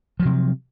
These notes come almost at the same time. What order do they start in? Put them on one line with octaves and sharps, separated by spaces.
F3 F#3 C3